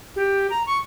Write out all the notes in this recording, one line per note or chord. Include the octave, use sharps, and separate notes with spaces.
G4
A#5
C#6